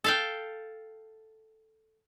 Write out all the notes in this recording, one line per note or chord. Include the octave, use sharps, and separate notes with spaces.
A4 F5 G5